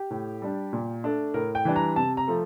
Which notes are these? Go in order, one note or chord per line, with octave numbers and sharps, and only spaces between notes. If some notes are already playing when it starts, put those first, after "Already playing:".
Already playing: G4
A2
G3 D4
A#2
A3 D4
A2 A#4
G5
E3 G3 D4
A#5
C3 A5
A#5
F3 A3